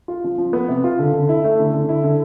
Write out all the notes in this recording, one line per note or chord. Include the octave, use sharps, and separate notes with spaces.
F4
F3
F3
B3
C3
F4
D3
D3
E4
A3
D3
D3
E4
D3